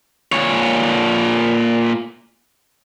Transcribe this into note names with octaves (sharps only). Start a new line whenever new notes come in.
A#2 C#5